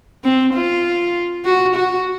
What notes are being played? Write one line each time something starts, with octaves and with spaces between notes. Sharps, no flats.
C4
F4
F#4
F#4